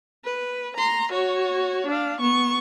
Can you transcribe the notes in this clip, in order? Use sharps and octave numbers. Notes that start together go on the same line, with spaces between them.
B4
A#5 C6
F#4 C#5
D4 F5
B3 C#6